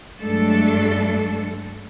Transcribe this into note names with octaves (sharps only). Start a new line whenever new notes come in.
G2 F#3 G#3 A3 D4 A4